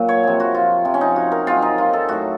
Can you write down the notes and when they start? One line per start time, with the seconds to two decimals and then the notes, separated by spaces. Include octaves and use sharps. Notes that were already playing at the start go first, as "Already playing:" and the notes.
Already playing: A#2 F#3
0.09 C#5
0.23 C3 F3
0.40 F#4
0.55 F4
0.85 C3 F3
0.94 C#4
1.01 D#4
1.16 F#4
1.32 A#4
1.47 C3 D#3 F#3 F4
1.62 D#4
1.78 F4
1.93 A4
2.09 A2 F#3 F#4